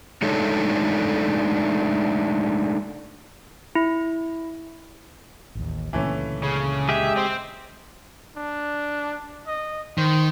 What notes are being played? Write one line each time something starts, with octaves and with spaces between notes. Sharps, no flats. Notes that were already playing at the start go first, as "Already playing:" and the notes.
G#3 A3 D4 D#4 A4 C#5
E4
A1 D#2
C#2 A#2 D3 E3 A3 C#4
C#3
G#3 G4 G#4 E5
C4
D4
D#5
D#3 C5